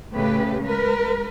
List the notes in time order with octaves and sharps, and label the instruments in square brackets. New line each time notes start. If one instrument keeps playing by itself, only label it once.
[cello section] A2 C#3 A3 G4 B4
G#3 A#4 B4